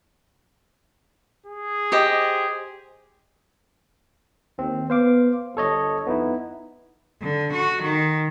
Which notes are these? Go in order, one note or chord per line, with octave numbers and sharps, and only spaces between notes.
G#4
G4 C5 D#5
D#2 C4
B3 C5 F5 D6
G1 A4 C#5 D#5
F2 B3 D#4 E4
D3
F#4
D#3